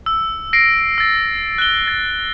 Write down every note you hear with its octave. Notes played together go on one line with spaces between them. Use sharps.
E6
A#6 C7 D7
E6 A6
F#6 G7
A6